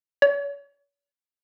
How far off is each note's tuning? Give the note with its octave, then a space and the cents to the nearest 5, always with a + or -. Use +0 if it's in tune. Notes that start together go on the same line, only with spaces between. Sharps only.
C#5 +45